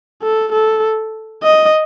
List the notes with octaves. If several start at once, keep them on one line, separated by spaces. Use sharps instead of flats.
A4
A4
D#5